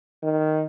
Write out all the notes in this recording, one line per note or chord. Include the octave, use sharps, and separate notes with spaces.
D#3